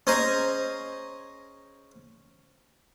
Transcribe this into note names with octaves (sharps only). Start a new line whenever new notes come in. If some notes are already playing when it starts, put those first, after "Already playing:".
C#4 G#4 C5 D#5 A#5